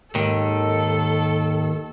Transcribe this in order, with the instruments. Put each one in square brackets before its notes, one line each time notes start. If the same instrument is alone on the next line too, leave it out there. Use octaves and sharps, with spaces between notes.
[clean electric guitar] D#2 D#3 [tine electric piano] G#2 D#5 [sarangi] A4